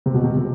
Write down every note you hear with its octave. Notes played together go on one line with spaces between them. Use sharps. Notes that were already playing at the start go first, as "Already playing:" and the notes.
C3
B2
C3
C3